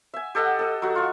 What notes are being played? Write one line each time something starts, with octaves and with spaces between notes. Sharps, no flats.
E5 G#5
G4 A4 D#5 F#5
A4 D#5
F#3 F#4
F4 C#6